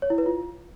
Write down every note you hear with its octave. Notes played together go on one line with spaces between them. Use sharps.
C#5
E4
B4
F4